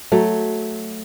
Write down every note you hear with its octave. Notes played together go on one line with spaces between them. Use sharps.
F#3 A3